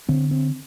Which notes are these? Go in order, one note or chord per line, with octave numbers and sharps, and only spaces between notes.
D3 C4
C4